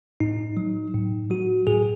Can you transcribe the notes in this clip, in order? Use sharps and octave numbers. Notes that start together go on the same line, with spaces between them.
A2 D#4
F#3
A2
F#3 F#4
A2 G#4